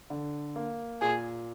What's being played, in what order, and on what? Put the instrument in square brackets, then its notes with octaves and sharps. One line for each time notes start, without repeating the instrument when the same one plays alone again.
[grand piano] D3
A#3
[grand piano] A#2 [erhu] G#4